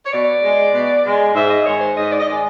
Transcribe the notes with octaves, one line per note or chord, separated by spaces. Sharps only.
C#5
B2 D5
G#3
B2
G#3
G#2 E5
D#5
D#3 G#3 C#5
C5
G#2 D#5
D5
D#5
D#3 G#3 D5